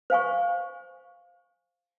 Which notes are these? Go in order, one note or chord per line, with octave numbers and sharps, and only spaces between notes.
C5 F5 G#5 C#6